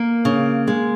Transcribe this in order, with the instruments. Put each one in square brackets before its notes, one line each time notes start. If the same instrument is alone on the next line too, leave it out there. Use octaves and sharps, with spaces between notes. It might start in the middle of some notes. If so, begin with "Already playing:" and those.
Already playing: [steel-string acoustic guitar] A#3
C#3
G#3